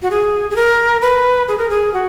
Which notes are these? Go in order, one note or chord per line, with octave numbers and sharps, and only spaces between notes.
F#4
G#4
G#4
A#4
B4
G#4
A#4
G#4
F#4